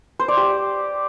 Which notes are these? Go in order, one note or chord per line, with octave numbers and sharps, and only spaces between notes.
C5
D5
G4